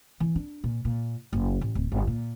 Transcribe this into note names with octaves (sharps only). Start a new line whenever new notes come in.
E3
D4
A#2
A#2
F#1
A1
D1
G1
A#2